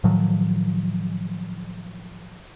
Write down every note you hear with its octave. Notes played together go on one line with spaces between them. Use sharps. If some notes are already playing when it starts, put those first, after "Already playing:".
A2 D#3 F3 F#3